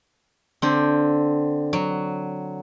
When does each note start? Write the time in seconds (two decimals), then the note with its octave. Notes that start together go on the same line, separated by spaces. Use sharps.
0.62 D3 C4
1.73 F#3